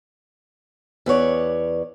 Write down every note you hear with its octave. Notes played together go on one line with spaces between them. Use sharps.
E2 B4 C#5 D5